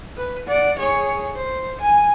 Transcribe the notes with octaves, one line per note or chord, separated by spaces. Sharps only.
B4
D5 F#5
G#4 C#5
C5
G#5